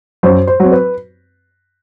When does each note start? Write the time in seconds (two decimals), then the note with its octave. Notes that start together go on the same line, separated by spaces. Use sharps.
0.23 F#2 C5
0.47 C5
0.60 F#3 C4
0.72 B4